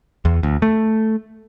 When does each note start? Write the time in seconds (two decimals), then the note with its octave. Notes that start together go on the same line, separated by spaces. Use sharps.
0.25 E2
0.43 D2
0.62 A3